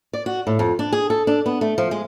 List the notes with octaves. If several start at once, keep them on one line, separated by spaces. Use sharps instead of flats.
D5
F#4
A2
F2
D4
G#4
A4
D4
B3
A3
F3
G#3